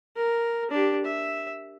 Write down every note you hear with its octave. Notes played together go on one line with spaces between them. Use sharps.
A#4
D4 G4
E5